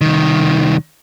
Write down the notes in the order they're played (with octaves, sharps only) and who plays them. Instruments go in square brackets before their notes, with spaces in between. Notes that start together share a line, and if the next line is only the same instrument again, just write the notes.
[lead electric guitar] C2 D#3